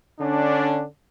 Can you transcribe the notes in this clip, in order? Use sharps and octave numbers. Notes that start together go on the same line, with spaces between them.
D3 C#4 D4